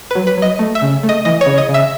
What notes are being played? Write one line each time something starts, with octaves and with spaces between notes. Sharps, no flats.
F#3 B4
B4
F#3 D#5
A3
E5
C#3
A3
D#5
E3 D#5
C#5
C#3
D#5
C#3
E5